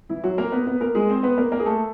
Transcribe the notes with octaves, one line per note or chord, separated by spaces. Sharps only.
E3 E4
F#3 F#4
A#3 A#4
B3 B4
B3 B4
A#3 A#4
G#3 G#4
C4 C5
B3 B4
A#3 A#4
A#3 A#4
G#4
A3 A4